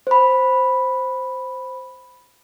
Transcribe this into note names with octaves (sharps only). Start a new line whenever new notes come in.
C5 B5